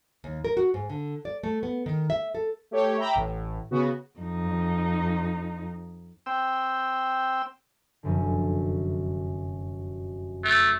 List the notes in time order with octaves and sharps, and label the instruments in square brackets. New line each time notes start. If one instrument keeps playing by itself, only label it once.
[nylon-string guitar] D#2
A#4
F#4
G#2
D3
D5
A3
B3
D#3
E5
A4
[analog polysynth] A3 G4 C#5
E5 G5 A#5 B5 D6
A1 A2
C#3 B3 F#4
[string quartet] F2 D#4
[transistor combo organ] C4 G5 E6
[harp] F1 F#2 D3
[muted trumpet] A3